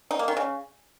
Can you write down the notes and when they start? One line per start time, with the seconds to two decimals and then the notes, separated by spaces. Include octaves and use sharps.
0.11 D#4
0.19 A#3
0.28 D#3
0.37 C#3